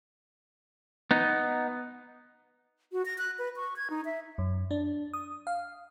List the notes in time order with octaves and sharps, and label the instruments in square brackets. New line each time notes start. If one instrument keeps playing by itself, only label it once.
[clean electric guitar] B3 D#4
[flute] F#4
A#6
F#6
B4
C#6
G#6
D#4
E5
[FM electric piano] F#2
D4
D#6
F5